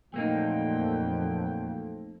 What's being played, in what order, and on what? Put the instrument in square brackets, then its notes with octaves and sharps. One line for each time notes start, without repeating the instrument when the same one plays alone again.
[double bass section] F2 [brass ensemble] A#2 F#3 G5 [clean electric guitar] A3 A#3 D#4